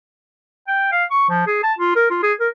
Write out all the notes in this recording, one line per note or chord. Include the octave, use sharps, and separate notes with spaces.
G5
F5
C#6
F3
G#4
A5
F4
A#4
F4
G#4
A#4